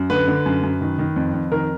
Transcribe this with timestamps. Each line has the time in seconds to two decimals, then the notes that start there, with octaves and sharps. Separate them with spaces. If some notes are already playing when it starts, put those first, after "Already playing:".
Already playing: F#2
0.10 D3 B4
0.28 D3
0.46 F#2
0.63 F#2
0.81 D#3
0.98 D#3
1.16 F2
1.34 F2
1.52 D#3 A#4